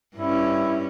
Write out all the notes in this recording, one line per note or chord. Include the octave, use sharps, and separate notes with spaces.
G2 C#4 E4